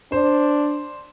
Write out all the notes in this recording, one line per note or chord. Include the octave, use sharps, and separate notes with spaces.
D4 C5